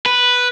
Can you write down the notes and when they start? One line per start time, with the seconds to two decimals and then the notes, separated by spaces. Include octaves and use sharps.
0.06 B4